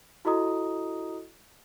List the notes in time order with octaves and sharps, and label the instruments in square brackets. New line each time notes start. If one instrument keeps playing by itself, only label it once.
[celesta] E4 F#4 A4 D#5 A#5 D#6